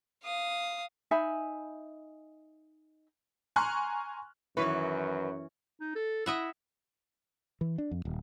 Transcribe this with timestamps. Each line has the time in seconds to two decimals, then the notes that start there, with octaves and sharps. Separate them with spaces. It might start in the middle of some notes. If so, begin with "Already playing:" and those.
0.23 F5 D#6
1.11 D#4 E5 G#5 B5
3.56 G#5 A#5 C6 C#6 F6 F#6
4.57 F#2 D#3 E3 F#3 C#4 B4
5.81 D#4
5.95 A4
6.26 E4 D#5 E5 F#5
7.61 E3
7.78 D4
7.91 F2
8.05 D#1